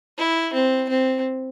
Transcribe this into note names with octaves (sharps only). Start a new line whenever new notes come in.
E4
C4
C4